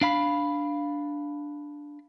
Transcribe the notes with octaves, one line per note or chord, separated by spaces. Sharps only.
D4 F5 B5